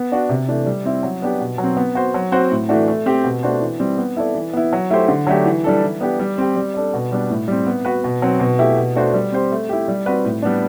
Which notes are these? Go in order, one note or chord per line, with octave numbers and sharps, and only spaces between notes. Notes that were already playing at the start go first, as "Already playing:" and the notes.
Already playing: B3
D4 F#4
C3
E3 A3 D4
G3
C4 E4
F#3
B3 D4 G4
B2
F#3
C4
B3
F#4 C5
F#3
C4 F#4 C5
A2
E3 A3 D4 F#4
A3
C4 G4
B2
A3 D4 F#4 C5
E3
G3 C4
B3
E4 A4 D5
E3
B3 E4
F#3
A3 E4 G4 C5
D3
F#3 A3 D4 G4
E3
G3 D4 A4
E3
B3 D4 G4
G3
C4 G4
G3
D4 A4 D5
B2
G3 B3 D4
A2
G3 C4
B3
F#4 B4
B2
F#3 C4
B2
A3 E4 G4
B2
A3 D4 F#4 C5
G3
C4 G4 C5
A3
E4 G4
G3
C4 F#4 B4 D5
A2
G3 B3 D4